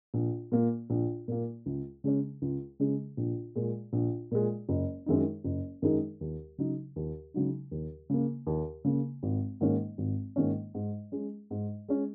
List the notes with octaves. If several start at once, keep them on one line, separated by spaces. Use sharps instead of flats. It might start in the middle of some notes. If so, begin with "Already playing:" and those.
A#1
A#2 A#3
A#1
A#2 A#3
C#2
C#3 G#3 C#4
C#2
C#3 G#3 C#4
A#1
A#2 G#3
A#1
A#2 G#3
F#1
F#2 D#3 G#3 D#4
F#1
F#2 D#3 G#3 D#4
D#2
C#3 F#3 D#4
D#2
C#3 F#3 D#4
D#2
C#3 A#3
D#2
C#3 A#3
G#1
G#2 D#3 A#3 C#4
G#1
G#2 D#3 A#3 C#4
G#2
G#3 C#4
G#2
G#3 C#4